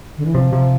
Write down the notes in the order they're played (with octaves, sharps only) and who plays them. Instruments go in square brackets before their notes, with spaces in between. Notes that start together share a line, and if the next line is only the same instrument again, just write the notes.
[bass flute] D3
E3
[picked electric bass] C3 [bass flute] F3
[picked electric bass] C3